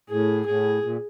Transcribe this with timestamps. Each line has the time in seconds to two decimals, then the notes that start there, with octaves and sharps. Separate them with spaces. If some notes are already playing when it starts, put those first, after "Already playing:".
0.09 A2 G#4
0.46 A2 G#4
0.83 A#2